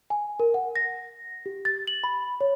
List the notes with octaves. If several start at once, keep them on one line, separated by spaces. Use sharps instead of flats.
G#5
A#4
F#5
A#6
G4
A6
F#7
B5
C#5